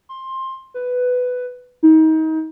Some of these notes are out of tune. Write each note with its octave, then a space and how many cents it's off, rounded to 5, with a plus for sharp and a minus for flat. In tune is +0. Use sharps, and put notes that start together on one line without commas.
C6 +15
B4 +10
D#4 +30